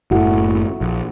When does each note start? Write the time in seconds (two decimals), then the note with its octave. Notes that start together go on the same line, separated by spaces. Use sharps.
0.11 F#1 A2 E4 F#4 A4
0.81 A#1